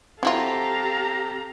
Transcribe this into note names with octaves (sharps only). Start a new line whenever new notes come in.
F#3 C4 E4 F4 G4 A4 F5 A#5